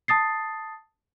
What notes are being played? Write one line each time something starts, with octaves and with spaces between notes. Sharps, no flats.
A5 D#6 A6 C7